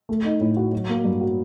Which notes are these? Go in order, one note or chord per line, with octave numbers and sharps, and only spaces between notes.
A3
D#4
A2
F#4
F#3
A#3
G2
F#4